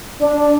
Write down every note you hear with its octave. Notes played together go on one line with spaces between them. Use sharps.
D4